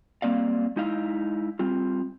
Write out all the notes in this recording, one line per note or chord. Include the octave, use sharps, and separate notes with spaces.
G3 A#3 C4 D5 F5
G#3 D#4 E4 F5
G3 C4 F4